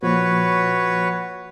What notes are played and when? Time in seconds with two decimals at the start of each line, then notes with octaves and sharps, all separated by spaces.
0.03 A#2 F3 F#4 B4 C#5